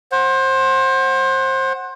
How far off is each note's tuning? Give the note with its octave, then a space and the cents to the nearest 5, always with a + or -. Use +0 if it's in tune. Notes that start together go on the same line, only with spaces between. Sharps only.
C5 +25 F#5 +0